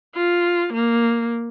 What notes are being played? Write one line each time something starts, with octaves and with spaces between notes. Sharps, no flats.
F4
A#3